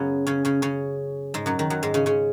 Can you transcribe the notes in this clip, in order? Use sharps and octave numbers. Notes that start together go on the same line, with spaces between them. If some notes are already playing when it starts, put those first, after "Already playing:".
Already playing: F#2 C#3 F#3 B3 C#4
C#3 C#4
C#3 C#4
C#3 C#4
G#2 G#3
F#2 F#3
D#3
F#2 F#3
G#2 G#3
C#3 C#4
C#3 C#4